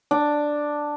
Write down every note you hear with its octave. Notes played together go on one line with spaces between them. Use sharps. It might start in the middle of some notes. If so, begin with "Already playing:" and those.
D4